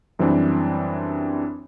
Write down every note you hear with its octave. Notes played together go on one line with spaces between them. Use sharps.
F#2 E3 G3 C4 D4